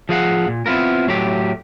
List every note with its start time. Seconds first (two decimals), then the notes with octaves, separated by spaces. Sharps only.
0.09 F3 G#4 F5 F#5
0.48 A#2
0.66 B3 C4 E4 F4 A#4
1.07 A2 F#3 A3 G4